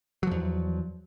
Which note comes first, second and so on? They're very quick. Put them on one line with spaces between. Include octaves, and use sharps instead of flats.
F#3 F3 E2